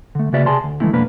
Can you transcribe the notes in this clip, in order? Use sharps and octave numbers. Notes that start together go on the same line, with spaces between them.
D3 A3
C#3 A#3 F#4 B4 D5 E5
C3 G#4 D5 G#5 A5 C6
D2
D3 E3 G#3 A3 C4 E4
F2 B2 F3 A#3 D4 B4